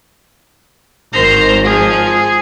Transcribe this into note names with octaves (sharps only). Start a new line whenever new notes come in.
G#1 G#2 D#3 C5 A#5
F3 G#4